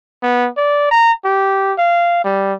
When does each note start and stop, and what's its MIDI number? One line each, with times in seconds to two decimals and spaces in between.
0.23 0.49 59
0.57 0.91 74
0.91 1.12 82
1.25 1.73 67
1.78 2.22 77
2.24 2.53 55